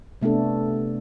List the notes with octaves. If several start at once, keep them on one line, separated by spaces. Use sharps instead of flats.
C3 A3 B3 D4 A4